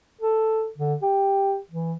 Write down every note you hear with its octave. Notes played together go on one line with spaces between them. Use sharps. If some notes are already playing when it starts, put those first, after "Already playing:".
A4
D3
G4
E3